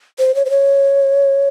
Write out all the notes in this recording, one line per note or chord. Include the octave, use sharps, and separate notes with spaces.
C5
C#5
C5
C#5